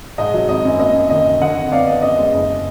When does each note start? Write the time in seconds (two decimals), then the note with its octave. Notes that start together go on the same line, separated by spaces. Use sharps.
0.18 G#2 D#5
0.34 F#3
0.49 G#1 D#5
0.65 F#2
0.79 A#3 D#5
0.94 F#2
1.10 D#3 D#5
1.26 D#3
1.41 D3 D#5 F#5
1.56 F2
1.72 B3 D5 F5
1.87 B3 D#5
2.02 F#2 D#5
2.18 G#3
2.34 F#1